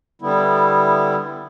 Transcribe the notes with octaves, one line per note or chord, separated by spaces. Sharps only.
D3 G3 B3 E4